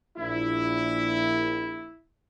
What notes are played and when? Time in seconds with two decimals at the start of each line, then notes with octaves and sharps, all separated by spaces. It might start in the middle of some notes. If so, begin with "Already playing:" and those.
0.17 A#1 E4